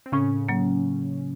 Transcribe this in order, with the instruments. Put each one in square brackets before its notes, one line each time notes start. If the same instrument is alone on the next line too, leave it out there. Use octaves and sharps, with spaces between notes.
[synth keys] C4
[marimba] A2 [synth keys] C#3 C#4
[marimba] F#3 A#3